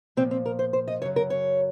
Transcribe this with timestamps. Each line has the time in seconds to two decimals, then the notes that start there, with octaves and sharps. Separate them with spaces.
0.17 A#2 F3 C4
0.31 C4
0.46 A#4
0.59 C5
0.73 C5
0.88 D#5
1.02 F#2 C#3 F#3 C#5
1.16 A#4
1.30 C#5